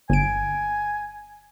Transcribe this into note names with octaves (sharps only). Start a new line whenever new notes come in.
G1 G#5 D7